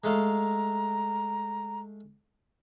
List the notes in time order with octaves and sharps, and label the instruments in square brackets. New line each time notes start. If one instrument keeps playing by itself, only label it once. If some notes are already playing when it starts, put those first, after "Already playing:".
[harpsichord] G#3 A3 F5 [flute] A#5